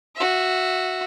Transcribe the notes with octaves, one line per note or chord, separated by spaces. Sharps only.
F#4 E5